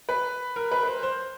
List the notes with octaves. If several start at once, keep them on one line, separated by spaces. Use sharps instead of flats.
B4
A#4
B4
B4
C5
C5